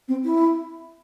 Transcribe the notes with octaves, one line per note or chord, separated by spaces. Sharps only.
C4
E4